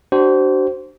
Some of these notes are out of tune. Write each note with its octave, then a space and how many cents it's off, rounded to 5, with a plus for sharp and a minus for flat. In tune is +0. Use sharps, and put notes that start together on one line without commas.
D4 +10 F#4 +45 C5 +0